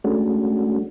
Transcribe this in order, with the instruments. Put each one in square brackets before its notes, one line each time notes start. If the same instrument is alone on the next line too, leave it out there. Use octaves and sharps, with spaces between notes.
[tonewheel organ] G#3 A3 C#4 D4 F#4